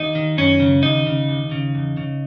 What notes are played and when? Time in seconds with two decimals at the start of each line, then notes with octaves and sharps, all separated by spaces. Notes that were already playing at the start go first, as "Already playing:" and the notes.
Already playing: D#2 D#4
0.15 D#3
0.37 F#2 C#4
0.60 C#3
0.83 D#2 D#4
1.06 C#3
1.28 D#2
1.51 C#3
1.75 E2
1.97 C#3